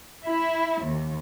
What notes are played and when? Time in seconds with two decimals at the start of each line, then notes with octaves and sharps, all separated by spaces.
0.24 E4
0.83 D#2